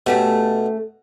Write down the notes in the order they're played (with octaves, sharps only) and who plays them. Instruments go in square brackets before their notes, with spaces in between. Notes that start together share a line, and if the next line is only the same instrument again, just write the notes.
[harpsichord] B2 [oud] A3 C#4 G4